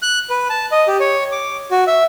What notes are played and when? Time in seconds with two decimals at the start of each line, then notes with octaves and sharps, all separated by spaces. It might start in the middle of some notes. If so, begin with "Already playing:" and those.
0.02 F#6
0.30 B4
0.50 A5
0.72 D#5
0.88 G4
1.00 C#5
1.32 D6
1.71 F#4
1.87 E5